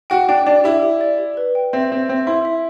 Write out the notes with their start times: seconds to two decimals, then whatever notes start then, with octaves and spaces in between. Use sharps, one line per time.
0.10 F#4 G5
0.29 D4 G5
0.47 D4 D5
0.64 E4 G4
0.83 G4
1.01 D5
1.18 G4
1.37 B4
1.55 G5
1.73 C4 E5
1.92 C4 E5
2.09 C4 E5
2.27 E4 C6
2.45 E5